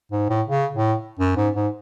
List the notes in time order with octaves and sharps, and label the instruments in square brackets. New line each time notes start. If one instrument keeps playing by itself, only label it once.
[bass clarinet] G#2
A2
C#3
A2
F#2
G#2
G#2